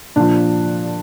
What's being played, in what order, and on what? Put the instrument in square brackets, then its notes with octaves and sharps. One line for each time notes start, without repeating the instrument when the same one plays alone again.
[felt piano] A#2 F3 D4